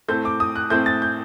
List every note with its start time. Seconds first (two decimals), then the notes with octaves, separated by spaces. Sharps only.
0.08 A2 A3 C4 G6
0.25 D6
0.40 D#6
0.56 F#6
0.70 A2 A3 C4 G6
0.86 A6
1.02 G6